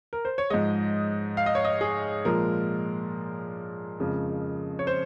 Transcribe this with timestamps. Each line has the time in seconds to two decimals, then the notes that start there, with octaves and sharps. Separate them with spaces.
0.13 A#4
0.25 C5
0.38 C#5
0.50 G#2 F3 G#3 D#5
1.37 F5
1.46 D#5
1.55 C#5
1.64 D#5
1.81 G#4
2.25 A#2 F3 G#3 A#4
4.00 F2 C#3 F3 G#3
4.79 C#5
4.87 C5